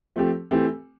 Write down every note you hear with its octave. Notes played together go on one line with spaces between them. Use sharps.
F3 A3 C4 G4
E3 A3 C4 G4